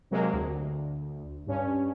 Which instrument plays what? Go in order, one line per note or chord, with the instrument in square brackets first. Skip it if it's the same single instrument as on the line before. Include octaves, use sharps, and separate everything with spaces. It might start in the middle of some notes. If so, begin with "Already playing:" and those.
[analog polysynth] C3 F#3 G#3 A#3
D2
G2 C#4